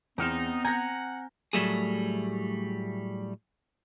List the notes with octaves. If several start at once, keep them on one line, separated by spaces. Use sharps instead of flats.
E2 B3 C4 D#4 F6 E7
F#5 G#5 A#5 G6 A#6
A2 F#3 G3 A3 G#4